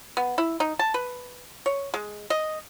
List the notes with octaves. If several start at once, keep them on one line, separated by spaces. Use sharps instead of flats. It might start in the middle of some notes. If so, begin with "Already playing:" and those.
B3
E4
D#4
A5
B4
C#5
G#3
D#5